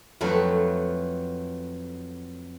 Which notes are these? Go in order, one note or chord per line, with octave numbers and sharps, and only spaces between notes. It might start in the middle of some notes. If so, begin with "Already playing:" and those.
F2 F#3 A3 B3 A4